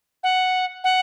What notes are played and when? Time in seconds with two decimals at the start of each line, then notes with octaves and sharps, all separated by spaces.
0.23 F#5
0.84 F#5